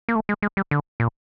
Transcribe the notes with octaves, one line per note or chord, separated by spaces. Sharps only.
A#3
A3
G#3
G#3
G3
D3
A#2